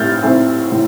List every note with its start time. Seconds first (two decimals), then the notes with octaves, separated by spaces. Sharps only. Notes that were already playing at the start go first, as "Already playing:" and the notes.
Already playing: A2 A3 C4 F6 G6 A6
0.23 A2 A3 C4
0.72 A2